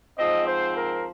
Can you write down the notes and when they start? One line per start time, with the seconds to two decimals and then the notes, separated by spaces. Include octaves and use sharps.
0.18 G#2 F3 C4 D#5
0.47 C5
0.76 A#4